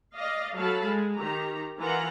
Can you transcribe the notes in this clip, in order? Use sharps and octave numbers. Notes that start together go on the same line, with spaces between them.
D5 D#5 F5
F#3 A4 F5 A5 B5
G#3
D#3 G4 A#5
E3 F4 A#4 F#5 A#5